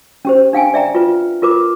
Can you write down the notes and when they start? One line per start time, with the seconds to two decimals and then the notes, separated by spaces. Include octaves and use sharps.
0.25 C#4 G4 C5
0.53 D4 F5 G5 G#5
0.74 D5 E5 G5 A#5
0.95 F4 B4
1.42 F4 A#4 B4 D6